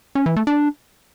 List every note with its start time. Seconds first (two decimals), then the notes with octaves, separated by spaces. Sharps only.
0.15 C#4
0.26 E3
0.36 A3
0.47 D4